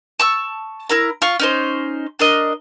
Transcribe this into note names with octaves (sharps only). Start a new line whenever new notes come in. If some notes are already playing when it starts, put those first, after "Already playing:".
A5 C#6 E6
E4 A#4 A#5
F4 C#6
C#4 D#4 C5
D4 A#4 D#5